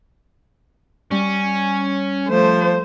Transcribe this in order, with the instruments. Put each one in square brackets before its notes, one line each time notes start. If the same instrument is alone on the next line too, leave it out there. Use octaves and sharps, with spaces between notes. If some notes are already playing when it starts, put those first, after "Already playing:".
[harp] G3 [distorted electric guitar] C#4
[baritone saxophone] F3 [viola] A3 C5